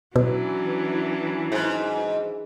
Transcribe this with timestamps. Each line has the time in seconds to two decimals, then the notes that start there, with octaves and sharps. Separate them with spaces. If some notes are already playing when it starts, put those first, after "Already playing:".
0.16 B2 E3 F#3 C#4 D4
1.52 G#2